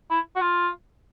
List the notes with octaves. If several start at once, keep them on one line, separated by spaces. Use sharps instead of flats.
E4
F#4
F4